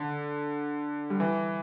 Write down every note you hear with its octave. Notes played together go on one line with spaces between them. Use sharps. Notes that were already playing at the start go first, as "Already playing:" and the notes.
Already playing: D3
G3
E3